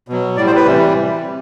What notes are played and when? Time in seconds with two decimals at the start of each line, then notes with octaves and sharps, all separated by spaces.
0.08 B2 F#3
0.36 A2 G3 D5
0.47 C5
0.56 B4
0.65 C3 E3 G3